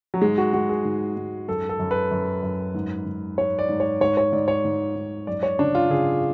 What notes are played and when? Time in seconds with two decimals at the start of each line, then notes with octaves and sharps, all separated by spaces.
0.14 F#3
0.22 G#2 G#3
0.38 F#4
0.53 G#2 F#4
0.69 G#4
0.85 G#2
1.17 G#2
1.48 F#2 A4
1.69 A4
1.79 F#2
1.91 B4
2.11 F#2
2.43 F#2
2.74 G#2
3.06 G#2
3.38 G#2 C#5
3.59 D5
3.69 G#2
3.80 C#5
4.01 G#2 C#5
4.17 C#5
4.32 G#2 D5
4.48 C#5
4.64 G#2
4.95 G#2
5.27 F#2 D5
5.43 C#5
5.59 C#3 D4
5.75 F4
5.90 C#3 G#4